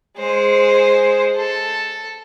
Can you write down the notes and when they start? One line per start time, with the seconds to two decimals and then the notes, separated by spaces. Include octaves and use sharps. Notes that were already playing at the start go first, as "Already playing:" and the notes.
0.17 G#3 C5
1.36 A4